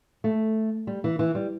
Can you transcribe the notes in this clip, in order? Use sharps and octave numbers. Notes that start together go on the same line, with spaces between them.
A3
G3
E3
E3
G3